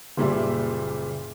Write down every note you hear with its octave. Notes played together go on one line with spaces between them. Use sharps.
F#1 A#2 G3 E5